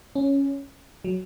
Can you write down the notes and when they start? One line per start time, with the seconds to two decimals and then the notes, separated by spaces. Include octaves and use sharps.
0.15 C#4
1.04 F#3